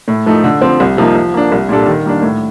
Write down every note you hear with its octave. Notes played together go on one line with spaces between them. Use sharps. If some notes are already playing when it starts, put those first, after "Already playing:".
A2
F3 A3 D#4
D3
F3 C4
C2
C3 F3 A#3 D#4
F3
A#3 D4
C2
A#2 G3 D4 A4
D#3
G3 A#3 D4
A2